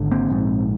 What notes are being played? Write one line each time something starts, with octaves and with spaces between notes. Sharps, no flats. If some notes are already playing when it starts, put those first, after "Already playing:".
Already playing: G#1 D3
A#3 C4
A#1 G#2